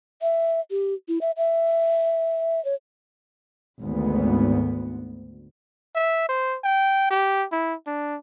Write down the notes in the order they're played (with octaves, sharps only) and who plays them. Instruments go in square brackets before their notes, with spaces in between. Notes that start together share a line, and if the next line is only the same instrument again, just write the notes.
[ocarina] E5
G4
E4
E5
E5
C#5
[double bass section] G#1 D2 B3
[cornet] E5
C5
G5
G4
E4
D4